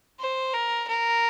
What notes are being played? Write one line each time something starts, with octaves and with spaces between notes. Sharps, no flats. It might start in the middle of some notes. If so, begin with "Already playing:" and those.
C5
A#4
A#4